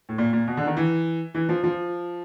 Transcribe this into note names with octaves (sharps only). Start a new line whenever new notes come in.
A2
A#2
A#2
B2
D3
D#3
E3
E3
F3
F3